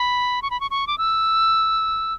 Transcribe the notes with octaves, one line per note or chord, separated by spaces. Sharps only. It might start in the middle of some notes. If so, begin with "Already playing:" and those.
Already playing: B5
C#6
B5
C#6
C#6
D6
E6